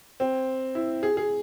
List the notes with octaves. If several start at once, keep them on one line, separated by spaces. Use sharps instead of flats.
C4
E4
G#4
G#4